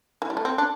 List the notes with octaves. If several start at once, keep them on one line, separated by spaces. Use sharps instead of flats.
E3
G3
A3
C4
D4